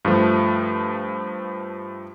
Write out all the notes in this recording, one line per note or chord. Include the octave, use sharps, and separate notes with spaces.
G2 F3 A3